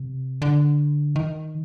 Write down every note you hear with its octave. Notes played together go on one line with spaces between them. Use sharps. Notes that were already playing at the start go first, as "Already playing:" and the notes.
Already playing: C3
D3
D#3